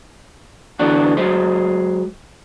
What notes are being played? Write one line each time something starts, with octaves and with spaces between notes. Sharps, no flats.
D3 E3 B3 D4 F#4
F#3 G#3 C5